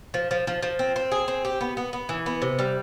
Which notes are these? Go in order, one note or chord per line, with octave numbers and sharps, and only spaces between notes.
F3
F3
F3
F3
C4
C4
G#4
C4
G4
B3
B3
B3
E3
B3
C3
G3